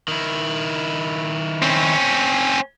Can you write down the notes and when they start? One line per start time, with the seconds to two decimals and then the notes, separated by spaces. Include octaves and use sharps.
0.08 D#3 E4
1.62 C4 C#4